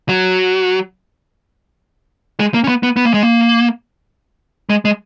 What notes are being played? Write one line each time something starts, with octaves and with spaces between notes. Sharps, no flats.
F#3
G#3
A#3
C#4
B3
B3
B3
A#3
G#3
A#3
G#3
G#3